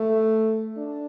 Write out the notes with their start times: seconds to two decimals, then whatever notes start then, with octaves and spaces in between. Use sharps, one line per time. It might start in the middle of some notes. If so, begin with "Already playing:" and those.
Already playing: A3
0.77 D4